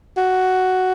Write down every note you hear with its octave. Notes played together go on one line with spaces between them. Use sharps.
F#4